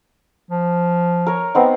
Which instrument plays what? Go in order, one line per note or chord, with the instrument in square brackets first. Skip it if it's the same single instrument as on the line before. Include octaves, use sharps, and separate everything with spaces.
[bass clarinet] F3
[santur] A#4 C#5
B3 C4 D#4